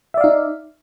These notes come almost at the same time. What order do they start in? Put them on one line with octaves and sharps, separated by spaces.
E5 D5 F5 D#4